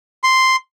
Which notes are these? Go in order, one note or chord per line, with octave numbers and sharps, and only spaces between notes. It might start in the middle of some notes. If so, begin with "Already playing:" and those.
C6